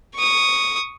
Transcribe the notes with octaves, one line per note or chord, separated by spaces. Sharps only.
C#6 D#6